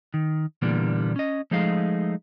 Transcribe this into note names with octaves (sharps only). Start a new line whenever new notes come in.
D#3
A#2 D3 E3 G3 A#3 B3
C#4 D#5
F3 G#3 A3 D#4 G#4 F5